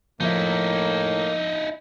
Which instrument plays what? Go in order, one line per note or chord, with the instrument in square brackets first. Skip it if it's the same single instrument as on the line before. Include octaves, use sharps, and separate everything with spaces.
[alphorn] A2 [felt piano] F3 E5 [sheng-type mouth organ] A#3 [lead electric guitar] D#4 E4